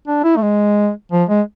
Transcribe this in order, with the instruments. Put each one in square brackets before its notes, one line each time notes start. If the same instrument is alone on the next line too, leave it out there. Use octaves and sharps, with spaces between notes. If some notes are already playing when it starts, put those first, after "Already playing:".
[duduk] D4
E4
A3
G#3
F3
G#3